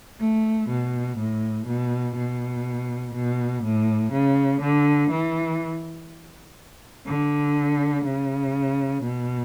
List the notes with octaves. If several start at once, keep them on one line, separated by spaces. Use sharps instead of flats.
A3
B2
A2
B2
B2
B2
A2
C#3
D3
E3
D3
C#3
B2